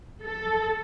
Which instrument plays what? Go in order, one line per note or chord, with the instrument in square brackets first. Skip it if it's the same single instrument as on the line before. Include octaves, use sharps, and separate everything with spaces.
[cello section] A4